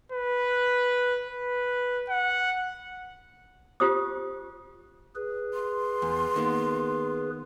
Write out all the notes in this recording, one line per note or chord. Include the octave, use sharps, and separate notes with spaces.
B4
B4
F#5
F4 G4 C5 D#6
G#4 B4
C6
E2
D#3 A#3 B3